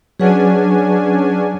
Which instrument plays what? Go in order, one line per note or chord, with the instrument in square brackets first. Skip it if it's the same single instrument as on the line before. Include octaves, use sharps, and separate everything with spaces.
[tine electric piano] F#3 [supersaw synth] C#4 D4 G#5 [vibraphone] G#4 B4 F#5